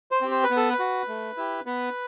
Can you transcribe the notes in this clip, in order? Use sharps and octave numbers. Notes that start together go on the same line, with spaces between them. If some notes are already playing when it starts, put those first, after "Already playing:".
C5
C4 G4
C5
B4
B3
A4
B4
F#4
A3
E4 G4
B3 B4